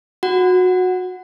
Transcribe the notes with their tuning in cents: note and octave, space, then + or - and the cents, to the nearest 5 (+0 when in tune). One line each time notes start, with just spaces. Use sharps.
F#4 -20 F#5 +0